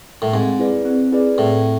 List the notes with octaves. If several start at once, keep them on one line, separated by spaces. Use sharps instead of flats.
A2
G#2 C4
E4 G#4 B4 D5
C4
E4 G#4 B4 D5
A2 C4